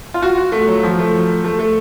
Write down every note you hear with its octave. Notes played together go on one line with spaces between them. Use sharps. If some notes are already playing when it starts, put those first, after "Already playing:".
F4
F#4
F#4
A3
F#3
F3
A3
A3
A3